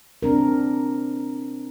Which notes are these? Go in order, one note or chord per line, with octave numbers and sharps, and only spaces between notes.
C4 D4 A#4